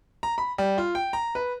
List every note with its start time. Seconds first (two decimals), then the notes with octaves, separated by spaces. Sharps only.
0.23 A#5
0.38 B5
0.58 G3
0.78 F4
0.95 G5
1.13 A#5
1.35 B4